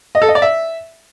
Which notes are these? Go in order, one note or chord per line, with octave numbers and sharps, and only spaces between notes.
D#5
A4
D#5
D5
E5